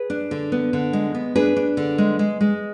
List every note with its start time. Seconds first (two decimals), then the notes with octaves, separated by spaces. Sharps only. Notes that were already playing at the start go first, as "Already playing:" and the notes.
Already playing: G#4 B4
0.10 D4
0.31 D3
0.52 B3
0.73 D3
0.93 G#3
1.14 B3
1.36 D4 G#4 B4
1.56 D4
1.77 D3
1.98 G#3
2.19 G#3
2.41 G#3